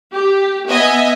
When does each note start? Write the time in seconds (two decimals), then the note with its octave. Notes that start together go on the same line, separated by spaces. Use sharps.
0.13 G4
0.67 B3 D#5 E5 G#5